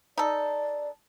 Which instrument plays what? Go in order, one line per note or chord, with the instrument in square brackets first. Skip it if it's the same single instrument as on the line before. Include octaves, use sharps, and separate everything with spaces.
[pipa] D#4 A4 [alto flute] D5